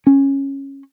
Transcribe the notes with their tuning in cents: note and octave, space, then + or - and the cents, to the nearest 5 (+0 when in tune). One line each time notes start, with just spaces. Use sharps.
C#4 -15